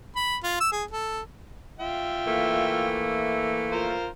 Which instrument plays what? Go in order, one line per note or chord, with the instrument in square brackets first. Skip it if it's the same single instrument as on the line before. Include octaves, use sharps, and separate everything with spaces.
[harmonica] B5
F4
E6
G#4
A4
F4 E5 G5
[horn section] E3 A3 A#3
[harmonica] F4 A#4 C5